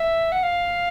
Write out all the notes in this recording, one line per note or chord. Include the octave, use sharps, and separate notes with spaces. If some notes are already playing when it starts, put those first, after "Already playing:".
Already playing: E5
F#5
F5